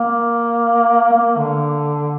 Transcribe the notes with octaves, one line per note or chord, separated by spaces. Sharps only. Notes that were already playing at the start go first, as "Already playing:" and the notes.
Already playing: A#3
A#3
D3